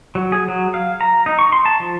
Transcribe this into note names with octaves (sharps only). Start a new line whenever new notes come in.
F#3
G#4
F#3
F5
A#5
D#4
C#6
C6
A5
F3